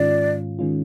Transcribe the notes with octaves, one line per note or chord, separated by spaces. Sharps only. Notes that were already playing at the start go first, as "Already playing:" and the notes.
Already playing: G#2 D#3 G#3 C#4 F4 D5
D#3 G#3 C#4 F4